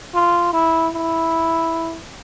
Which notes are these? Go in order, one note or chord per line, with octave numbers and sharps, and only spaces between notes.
F4
E4
E4